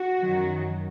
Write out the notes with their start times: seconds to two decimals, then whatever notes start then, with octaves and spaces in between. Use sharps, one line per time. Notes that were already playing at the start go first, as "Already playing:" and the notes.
Already playing: F#4
0.20 F#2 D#3 F#3